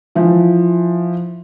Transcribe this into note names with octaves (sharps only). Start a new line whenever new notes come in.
E3 F3